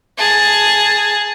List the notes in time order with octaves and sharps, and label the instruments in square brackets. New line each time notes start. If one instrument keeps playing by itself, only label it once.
[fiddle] G#4 A5